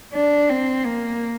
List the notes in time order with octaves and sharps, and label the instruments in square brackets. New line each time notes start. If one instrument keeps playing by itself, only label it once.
[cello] D4
C4
A#3